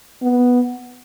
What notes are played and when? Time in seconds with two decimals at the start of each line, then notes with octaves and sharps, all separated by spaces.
0.22 B3